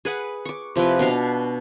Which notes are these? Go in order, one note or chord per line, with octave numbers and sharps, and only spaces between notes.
G#4 B4 F#5
C#6 D6
C3 F3 E4 B4
B2 D4 F5